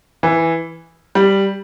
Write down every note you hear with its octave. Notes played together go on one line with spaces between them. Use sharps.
E3
G3